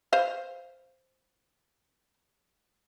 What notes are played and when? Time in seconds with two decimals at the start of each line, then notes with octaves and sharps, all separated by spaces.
0.13 B4 C5 F5